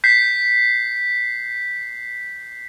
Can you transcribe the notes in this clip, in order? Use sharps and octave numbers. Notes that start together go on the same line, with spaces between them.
G6 B6 C7